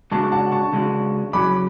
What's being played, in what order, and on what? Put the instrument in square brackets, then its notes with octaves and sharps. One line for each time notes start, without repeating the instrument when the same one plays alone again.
[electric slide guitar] C#3 G#3 D4 F#4 [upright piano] A5 C#6
[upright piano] F#5 A5
A5 C#6
[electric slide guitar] C#3 G#3 D4 F#4
[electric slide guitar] F#2 C#3 F#3 C#4 [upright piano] B5 D6